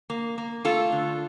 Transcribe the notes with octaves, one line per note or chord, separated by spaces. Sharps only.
A#3
A#3
A3 F4 A4
D3